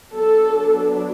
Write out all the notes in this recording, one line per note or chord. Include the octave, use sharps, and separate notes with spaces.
F#3 B3 D4 A4